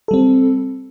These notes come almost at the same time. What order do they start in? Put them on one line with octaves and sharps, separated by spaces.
A4 G3 C4